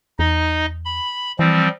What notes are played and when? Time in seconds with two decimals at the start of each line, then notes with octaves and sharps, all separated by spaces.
0.19 E2 D#4 D#5
0.85 B5
1.39 E3 F3 G3 C4